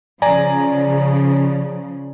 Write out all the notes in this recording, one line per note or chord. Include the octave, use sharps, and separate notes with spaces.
C#3 F3 D5 G#5 A#5